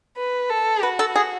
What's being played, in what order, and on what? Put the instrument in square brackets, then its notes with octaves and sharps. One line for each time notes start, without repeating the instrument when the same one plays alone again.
[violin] B4
A4
[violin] F#4 [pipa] B4
[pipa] A4
G#4